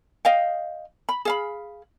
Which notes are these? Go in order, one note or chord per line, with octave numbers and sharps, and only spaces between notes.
D#5 F5 G5
B5
G#4 F5 B5